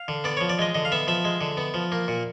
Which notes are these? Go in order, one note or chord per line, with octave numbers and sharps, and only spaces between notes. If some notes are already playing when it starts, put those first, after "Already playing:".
Already playing: F5
D3
B3 D5
F3 C#5
D5
G#3 D#5
D3 D#5
F5
B3 E5
F3 E5
G#3
D3
B3
F3
A#3
A#2